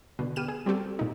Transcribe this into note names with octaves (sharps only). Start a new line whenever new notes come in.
B2 D3
B3 G4 F6 D#7 E7
G#4
G3 C4 F#4 G4 A4
A#2 D#4